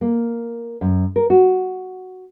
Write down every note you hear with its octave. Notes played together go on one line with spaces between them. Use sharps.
A#3
F#2
A#4
F#4